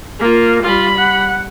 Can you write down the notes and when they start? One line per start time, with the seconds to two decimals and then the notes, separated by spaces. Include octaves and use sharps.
0.19 A#3 F4
0.63 G3 F4 B5
0.97 F#5